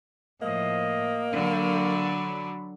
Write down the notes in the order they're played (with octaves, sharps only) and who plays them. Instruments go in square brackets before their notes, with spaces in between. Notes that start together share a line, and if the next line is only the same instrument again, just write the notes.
[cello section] A2 F3 [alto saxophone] A#3 [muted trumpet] D#5
[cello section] D3 F#3 [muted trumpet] B5